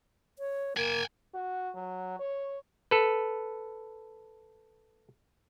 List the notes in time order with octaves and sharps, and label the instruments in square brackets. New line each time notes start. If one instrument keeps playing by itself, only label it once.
[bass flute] C#5
[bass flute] A#3 [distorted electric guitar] G5 G#5
[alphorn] F#4
F#3
C#5
[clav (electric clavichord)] A4 B4